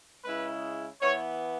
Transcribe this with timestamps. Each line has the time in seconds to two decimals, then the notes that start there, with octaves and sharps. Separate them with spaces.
0.23 C#3 G#3 E4 B4
1.01 E3 B3 E4 C#5